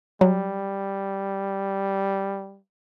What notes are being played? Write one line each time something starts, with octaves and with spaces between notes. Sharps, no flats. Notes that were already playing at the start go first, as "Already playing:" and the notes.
F#3 G3